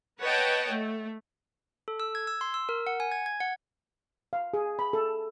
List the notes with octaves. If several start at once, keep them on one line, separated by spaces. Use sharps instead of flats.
B4 C#5 D#5 F#5 G5 A5
A3
A4
E6
G#6
E6
C6
E6
A#4
F#5
G#5
G#6
G#6
F#5
F5
G#4
B5
A4